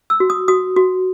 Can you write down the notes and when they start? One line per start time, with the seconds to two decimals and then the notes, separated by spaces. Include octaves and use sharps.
0.10 E6
0.20 F#4
0.30 D#6
0.48 F#4 D#6
0.76 F#4